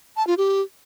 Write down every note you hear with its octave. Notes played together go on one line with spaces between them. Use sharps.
A5
F4
G4